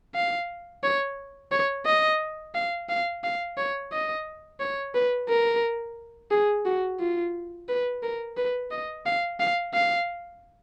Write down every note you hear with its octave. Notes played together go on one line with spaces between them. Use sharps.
F5
C#5
C#5
D#5
F5
F5
F5
C#5
D#5
C#5
B4
A#4
G#4
F#4
F4
B4
A#4
B4
D#5
F5
F5
F5